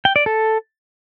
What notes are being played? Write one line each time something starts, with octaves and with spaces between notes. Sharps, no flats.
G5
D5
A4